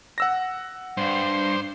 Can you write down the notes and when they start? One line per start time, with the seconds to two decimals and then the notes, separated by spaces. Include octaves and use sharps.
0.18 F#5 E6 A#6
0.97 G2 C5